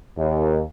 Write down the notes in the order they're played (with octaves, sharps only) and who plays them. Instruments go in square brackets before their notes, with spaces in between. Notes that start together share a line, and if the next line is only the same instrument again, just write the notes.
[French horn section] D#2